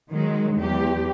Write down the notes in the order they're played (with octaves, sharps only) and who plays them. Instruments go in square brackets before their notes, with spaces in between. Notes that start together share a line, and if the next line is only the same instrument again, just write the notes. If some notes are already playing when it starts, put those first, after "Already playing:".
[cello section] D#3 F#3 G#3
E2 G4